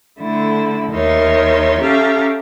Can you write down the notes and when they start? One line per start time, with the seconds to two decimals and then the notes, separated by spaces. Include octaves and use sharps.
0.18 D3 A3 E4
0.92 D#2 D#4 A#4 C#5 E5 C6
1.80 C#4 G4 A4 E5 F5 A#5